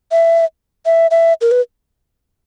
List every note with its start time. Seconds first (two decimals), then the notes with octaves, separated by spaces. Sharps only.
0.11 E5
0.86 E5
1.11 E5
1.41 A#4
1.51 B4